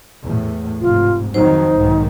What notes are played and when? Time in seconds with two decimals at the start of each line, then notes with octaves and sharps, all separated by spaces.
0.23 E2 A2
0.81 F1 G#2 F4
1.34 F2 D#3 F#3 D#4 C5
1.77 B1 G#2 D#3